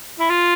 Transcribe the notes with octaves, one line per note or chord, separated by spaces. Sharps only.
E4
F4